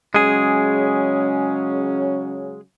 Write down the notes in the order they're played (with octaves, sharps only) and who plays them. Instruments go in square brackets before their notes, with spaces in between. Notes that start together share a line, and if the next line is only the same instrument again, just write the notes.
[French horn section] C#3 F#3 C#4 [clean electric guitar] G#3 G#4